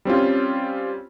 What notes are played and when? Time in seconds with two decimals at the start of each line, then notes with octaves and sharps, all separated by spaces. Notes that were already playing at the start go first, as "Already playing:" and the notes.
0.05 G3 C4 C#4 F4